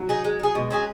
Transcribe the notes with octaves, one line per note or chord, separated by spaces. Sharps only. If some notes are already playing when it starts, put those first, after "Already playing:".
Already playing: F#3
D#4 G#4
G#3
D#4 G#4
B2 G#3
F#3 C#4 G#4